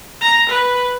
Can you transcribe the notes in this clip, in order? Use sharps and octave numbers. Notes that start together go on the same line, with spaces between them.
A#5
B4